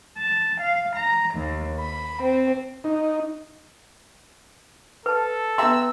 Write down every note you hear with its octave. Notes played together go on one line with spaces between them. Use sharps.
A5
F5
A#5
D#2
B5
C4
D#4
A4 B4 A5
B3 E5 G5 A#5 C6 E6